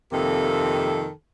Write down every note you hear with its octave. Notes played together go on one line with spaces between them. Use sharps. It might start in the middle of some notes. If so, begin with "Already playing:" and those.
F2 C3 D#3 A#3 A4